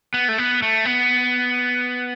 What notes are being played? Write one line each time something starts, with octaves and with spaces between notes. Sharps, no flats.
B3
A3
B3
A3
B3